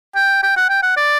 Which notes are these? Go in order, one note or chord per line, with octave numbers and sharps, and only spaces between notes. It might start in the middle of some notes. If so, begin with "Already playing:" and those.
G5
G5
F#5
G5
F#5
D5